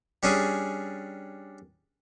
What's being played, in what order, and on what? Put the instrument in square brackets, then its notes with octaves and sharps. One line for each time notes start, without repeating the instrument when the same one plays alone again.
[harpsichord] G3 C#4 D4 G#4